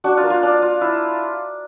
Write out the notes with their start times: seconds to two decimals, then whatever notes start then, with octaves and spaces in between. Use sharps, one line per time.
0.04 D4 F#4
0.17 F4
0.23 A#3
0.30 F4
0.43 D4
0.62 F4
0.81 E4